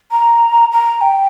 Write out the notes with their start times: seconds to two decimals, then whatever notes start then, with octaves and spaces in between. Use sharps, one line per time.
0.11 A#5
0.72 A#5
1.01 G5